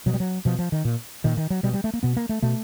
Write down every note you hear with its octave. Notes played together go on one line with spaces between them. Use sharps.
B2 F#3
G3
F#3
B2 F3
F3
D#3
A#2
A#2 D#3
D#3
F#3
B2 G3
G3
A3
A#3
B2 B3
A#3
A3
B2 A3